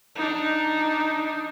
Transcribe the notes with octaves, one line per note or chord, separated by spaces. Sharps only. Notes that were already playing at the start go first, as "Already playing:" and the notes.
D4 D#4